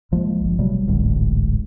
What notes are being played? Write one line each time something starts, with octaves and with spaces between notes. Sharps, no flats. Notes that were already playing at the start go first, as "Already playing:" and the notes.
B1 F3 G#3 A#3
G1
B2 F#3 G3 A3
D1 A1 D2 G#2